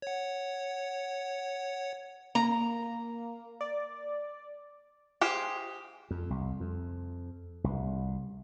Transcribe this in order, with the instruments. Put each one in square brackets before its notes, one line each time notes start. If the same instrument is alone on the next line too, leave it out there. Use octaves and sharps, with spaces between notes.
[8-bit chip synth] C#5 F#5
[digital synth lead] A#3 [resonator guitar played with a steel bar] A#5
[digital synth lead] D5
[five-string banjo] G4 G#4 C5
[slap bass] F2
C2
F2
C2